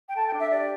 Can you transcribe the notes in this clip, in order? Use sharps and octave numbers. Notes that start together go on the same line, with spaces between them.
G5
A4 A5
G5
D4
E5
G4 D5